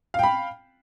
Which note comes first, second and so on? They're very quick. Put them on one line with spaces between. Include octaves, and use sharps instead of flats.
F5 G5 B5